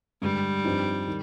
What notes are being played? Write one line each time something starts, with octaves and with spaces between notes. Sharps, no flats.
G2 D3 G3 G#3
G2 F3 C4 D#4
D#3